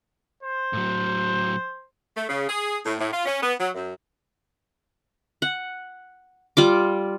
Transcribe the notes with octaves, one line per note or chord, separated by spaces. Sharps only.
C5
A2 F#3
A3
C#3
G#4
A2
A2
F4
C#4
B3
F#3
F#2
F#5
G3 F4 D6